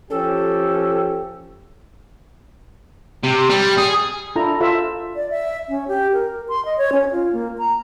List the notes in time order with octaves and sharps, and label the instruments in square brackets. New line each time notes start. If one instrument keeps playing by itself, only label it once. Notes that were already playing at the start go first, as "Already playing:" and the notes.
[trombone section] F3 C#4 G4 [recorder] A4
[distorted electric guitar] C3
G3
G#4
[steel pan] D4 E4 F4 A4 A#5
F4 A4 C5 E5
[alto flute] D5
E5
C#4
G4
A#4
C6
D#5
C#5
C#4
F4
A#3
A#5